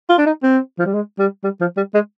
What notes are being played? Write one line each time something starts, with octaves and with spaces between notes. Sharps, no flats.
F4
D4
D#4
C4
F3
G3
G#3
G3
G3
F3
G3
G#3